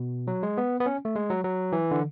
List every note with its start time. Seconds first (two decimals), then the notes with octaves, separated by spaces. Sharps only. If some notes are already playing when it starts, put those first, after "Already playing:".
Already playing: B2
0.27 F#3
0.43 G#3
0.58 B3
0.80 B3
0.86 C#4
1.05 A3
1.16 G#3
1.30 F#3
1.44 F#3
1.72 E3
1.91 D3